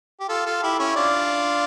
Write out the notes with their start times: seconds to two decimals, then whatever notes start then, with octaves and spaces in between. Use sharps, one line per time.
0.20 G4
0.29 F4 A4
0.46 F4 A4
0.62 E4 G4
0.79 C#4 E4
0.96 D4 F4